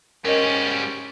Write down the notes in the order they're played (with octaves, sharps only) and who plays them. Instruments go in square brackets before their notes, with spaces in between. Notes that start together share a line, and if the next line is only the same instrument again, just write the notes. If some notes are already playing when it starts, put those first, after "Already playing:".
[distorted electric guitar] G#2 G3 [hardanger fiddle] C#4 [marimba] A#4 D#5